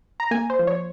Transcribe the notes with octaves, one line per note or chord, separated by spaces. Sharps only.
A#5
A#3 G#5
C5
F3
C#5